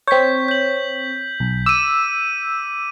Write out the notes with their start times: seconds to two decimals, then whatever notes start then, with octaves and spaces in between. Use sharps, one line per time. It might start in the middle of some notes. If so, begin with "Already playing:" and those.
0.08 C4 C#5 G6 B6
0.48 G6 F#7
1.40 B1
1.66 D6 E6 D#7